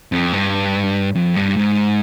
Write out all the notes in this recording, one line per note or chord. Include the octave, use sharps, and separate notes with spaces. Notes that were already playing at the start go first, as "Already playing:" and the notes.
F2
G2
F2
G2
G#2